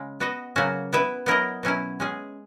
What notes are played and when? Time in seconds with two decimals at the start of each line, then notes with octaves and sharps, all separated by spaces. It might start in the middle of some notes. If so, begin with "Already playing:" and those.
Already playing: C#3 G#3
0.20 B3 F#4 B4 D#5
0.56 C#3 F#3 A#3 C#4 F#4
0.93 B3 E4 B4 E5
1.26 F#3 B3 E4 A#4 D#5
1.63 B2 F#3 C#4 E4
2.00 G#3 C#4 G#4